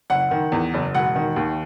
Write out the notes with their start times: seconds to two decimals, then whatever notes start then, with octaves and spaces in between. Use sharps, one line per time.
0.10 F#1 F#5
0.31 D#3
0.52 E2
0.74 F#1
0.95 E1 F#5
1.16 D#3
1.36 D#2